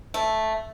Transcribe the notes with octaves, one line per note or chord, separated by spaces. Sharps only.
A3